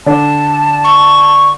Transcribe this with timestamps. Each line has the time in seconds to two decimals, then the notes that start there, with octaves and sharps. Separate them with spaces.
0.06 D3 D4 A5
0.84 C#6